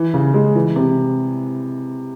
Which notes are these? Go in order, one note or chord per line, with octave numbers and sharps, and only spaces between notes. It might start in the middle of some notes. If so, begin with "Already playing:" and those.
Already playing: E3
C#3
G#3
E3
C3